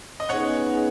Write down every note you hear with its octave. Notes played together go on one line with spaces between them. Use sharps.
D#5
C#3 B3 D#4 G#4 C#5 F#5